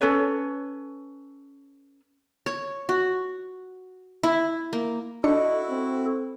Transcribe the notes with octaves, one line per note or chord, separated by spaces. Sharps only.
C#4 A4 B4 C#5
C#5
F#4
E4
A#3
D4 E4 F#4 A4 D#5 C#7
C4